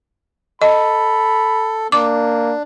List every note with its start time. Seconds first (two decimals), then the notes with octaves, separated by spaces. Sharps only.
0.62 A4 D#5 B5
1.92 A#3 D4 D6